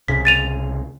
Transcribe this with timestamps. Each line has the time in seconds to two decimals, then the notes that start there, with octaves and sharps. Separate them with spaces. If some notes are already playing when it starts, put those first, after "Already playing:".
0.08 C2 C#3 B6
0.25 A6 D#7 F7